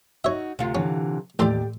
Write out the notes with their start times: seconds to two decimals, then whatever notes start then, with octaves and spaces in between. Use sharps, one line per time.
0.24 D#4 F#4 C#5 E5
0.59 D2 C3 F4
0.75 D3 E3 C#4
1.39 A1 D#2 G4 A4 D5 C6